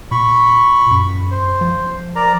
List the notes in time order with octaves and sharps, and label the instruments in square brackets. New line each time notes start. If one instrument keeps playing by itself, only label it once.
[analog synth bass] A#2 [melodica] B5 C#6
[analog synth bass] F#2
[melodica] C5
[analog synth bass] F3
[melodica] A#4 D5 A#5